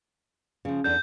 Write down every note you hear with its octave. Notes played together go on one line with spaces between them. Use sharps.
C#3 F3
E2 D4 A4 G6